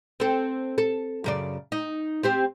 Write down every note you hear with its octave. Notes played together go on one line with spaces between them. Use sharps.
C4 A4
A4
F#2 C#3 D5
D#4
C4 G4 C5